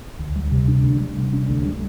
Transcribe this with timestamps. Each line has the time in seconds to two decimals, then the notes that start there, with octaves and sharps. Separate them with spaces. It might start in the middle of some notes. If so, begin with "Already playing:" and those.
0.19 D2
0.36 G3
0.51 C3
0.68 D4
0.84 D2
1.00 G3
1.17 C3
1.33 D4
1.49 D2
1.65 G3